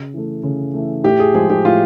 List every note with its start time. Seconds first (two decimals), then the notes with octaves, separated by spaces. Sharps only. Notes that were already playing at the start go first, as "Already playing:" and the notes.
Already playing: C#3
0.14 E3 A3
0.43 C#3
0.74 E3 A3
1.04 A2 G4
1.19 G#4
1.34 F3 G#3 G#4
1.50 G4
1.65 A2 F4